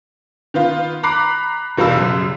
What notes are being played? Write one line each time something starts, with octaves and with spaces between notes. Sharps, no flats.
D#3 B3 F4
A#5 B5 D6 F#6 C7
E2 B2 G3 F5 B5 E6
F#2 C#3